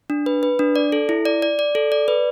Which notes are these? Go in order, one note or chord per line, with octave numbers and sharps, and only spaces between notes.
D4
B4
B4
D4
D5
A4
E4
D5
D5
D5
A4
D5
B4